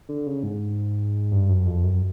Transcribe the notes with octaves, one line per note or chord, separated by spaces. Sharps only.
D3
C#3
G#2
G2
F#2
F2
F#2